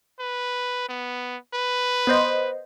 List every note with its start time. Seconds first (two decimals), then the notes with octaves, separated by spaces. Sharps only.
0.20 B4
0.89 B3
1.55 B4
2.07 B3 C5 D#5